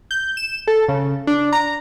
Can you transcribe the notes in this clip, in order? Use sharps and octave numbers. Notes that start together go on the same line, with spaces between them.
G6
E7
A4
C#3
D4
A#5